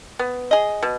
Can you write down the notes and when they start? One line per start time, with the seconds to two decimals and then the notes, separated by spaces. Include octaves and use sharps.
0.19 B3
0.51 G#4 D#5
0.83 B2